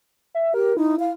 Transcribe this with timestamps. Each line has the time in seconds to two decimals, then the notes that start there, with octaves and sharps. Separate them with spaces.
0.35 E5
0.54 G4 A#4
0.77 D#4 E4
0.99 F5